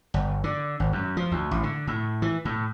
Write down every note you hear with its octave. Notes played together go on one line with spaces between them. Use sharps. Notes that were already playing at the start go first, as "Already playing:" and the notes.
G1
D3
G#1
F#2
F3
D2
A1
D3
A2
E3
A2